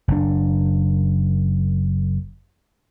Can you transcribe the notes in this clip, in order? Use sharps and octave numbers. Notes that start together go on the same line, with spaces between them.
F#1 D4